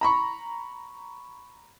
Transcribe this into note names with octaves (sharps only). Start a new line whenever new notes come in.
A#5 B5 C#6